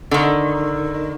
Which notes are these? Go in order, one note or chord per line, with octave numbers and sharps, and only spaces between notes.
D3 D#3